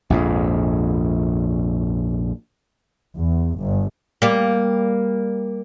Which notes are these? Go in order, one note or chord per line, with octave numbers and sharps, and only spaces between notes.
A#1 F2 G#2
E2
G1
G3 A#3